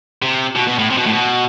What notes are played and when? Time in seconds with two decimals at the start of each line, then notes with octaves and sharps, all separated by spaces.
0.22 C3
0.56 B2
0.68 B2
0.79 A2
0.90 C3
0.97 B2
1.06 A2
1.13 B2